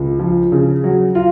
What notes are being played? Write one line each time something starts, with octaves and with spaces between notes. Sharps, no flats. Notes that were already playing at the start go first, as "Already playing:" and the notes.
Already playing: C#2
F3
C#3
F#3
F4